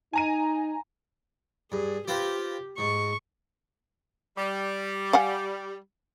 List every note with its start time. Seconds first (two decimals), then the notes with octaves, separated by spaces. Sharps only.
0.13 D#4 G#5 A#5 D#7
1.72 G2 G#4
2.08 C4 F4 G4 B4
2.78 G#2 C#6
4.37 G3
5.13 F5 F#5 G#5